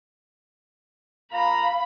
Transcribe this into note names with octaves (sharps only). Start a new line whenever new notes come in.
A#2 F5 A#5 B5